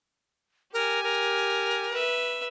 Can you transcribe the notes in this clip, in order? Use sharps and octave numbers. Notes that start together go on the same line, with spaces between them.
G4 A#4 G#5
A#4
B4 E5